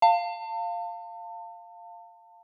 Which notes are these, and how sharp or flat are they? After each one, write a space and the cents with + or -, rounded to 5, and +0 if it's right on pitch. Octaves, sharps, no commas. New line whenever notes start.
F5 +0 A5 +35